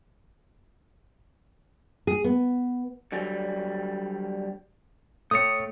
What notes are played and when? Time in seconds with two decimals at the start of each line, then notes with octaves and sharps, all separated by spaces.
2.07 G#4
2.24 B3
3.12 D3 F#3 G3
5.31 A3 C#5 D#6 C#7